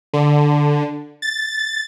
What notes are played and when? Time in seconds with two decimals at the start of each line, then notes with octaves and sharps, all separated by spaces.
0.13 D3
1.22 A6